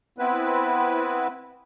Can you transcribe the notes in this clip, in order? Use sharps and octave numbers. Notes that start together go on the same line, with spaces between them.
B3 C4 E4 B4